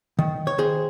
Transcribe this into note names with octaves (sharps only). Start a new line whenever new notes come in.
D#3
C#5
D#3 G#4 C5